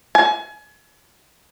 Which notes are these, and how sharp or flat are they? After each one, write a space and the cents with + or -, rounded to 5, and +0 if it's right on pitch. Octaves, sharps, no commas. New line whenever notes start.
G#5 +30